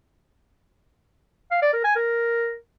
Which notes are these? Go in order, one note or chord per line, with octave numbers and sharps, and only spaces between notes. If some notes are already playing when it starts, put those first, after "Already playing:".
F5
D5
A#4
G#5
A#4